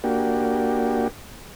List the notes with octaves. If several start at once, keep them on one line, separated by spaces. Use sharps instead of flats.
A#3 D4 F#4 G4